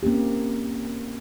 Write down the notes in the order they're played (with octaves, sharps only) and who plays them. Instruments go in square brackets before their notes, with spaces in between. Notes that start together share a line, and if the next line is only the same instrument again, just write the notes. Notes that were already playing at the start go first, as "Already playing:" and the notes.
[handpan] A#3 C4 C#4 G4